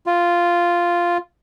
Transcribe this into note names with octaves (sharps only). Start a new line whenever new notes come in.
F4